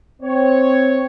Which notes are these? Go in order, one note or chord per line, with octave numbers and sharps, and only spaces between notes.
C4 C#5